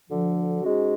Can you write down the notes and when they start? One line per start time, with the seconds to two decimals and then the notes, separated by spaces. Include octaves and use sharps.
0.10 D2 D3 F3
0.62 G#2 G#3 C#4 F#4